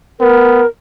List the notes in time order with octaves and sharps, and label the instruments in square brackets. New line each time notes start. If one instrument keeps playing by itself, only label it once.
[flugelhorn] B3 [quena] A#4